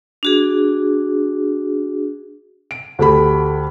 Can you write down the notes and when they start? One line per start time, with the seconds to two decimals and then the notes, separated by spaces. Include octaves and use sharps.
0.23 D4 F#4 G#4
2.71 D7
2.99 D2 A3 G4 B5